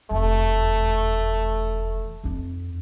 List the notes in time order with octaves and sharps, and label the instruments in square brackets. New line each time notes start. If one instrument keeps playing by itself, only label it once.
[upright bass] F1 E2 [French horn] A3
[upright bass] F2 D#4